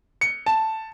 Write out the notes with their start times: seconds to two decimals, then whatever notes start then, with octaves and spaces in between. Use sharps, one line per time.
0.21 C#7
0.46 A5